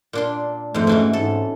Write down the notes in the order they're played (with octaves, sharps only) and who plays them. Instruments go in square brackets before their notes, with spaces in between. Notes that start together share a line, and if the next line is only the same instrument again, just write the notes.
[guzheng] A#2 D4 C6
[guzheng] F2 G#2 [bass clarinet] A3
[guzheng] B2 E3 C#4
[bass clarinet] G#2 [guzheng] A4